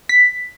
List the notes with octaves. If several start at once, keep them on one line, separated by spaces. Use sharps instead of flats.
B6